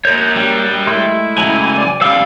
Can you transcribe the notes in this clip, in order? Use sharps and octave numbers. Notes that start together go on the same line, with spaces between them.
A#3 A#4 C#5 G6
G3
G#3 A3 E4 C6
C#3 F#3 G#5
D5
C#3 G3 F5 E6 F6